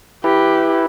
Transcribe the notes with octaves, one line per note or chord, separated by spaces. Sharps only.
E4 G4 B4